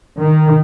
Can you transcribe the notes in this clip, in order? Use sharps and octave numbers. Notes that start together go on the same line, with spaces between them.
D#3